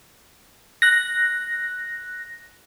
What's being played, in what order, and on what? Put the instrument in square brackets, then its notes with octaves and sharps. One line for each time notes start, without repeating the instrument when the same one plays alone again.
[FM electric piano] F#6 A#6